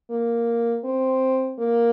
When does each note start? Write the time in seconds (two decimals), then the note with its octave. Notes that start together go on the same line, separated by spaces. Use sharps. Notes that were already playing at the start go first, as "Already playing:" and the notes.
0.11 A#3
0.85 C4
1.59 A#3